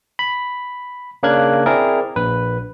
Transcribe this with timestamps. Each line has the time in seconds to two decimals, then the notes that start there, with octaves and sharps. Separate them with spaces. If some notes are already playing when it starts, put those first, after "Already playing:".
0.19 B5
1.23 C#3 A#3 D4 A#4 F#6 G#6
1.66 C4 E4 G#4 A#4 D5
2.16 A#1 B4